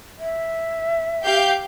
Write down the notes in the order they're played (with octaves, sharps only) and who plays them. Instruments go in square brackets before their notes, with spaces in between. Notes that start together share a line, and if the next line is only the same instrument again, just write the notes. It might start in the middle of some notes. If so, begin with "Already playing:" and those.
[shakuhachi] E5
[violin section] G4 F5 G6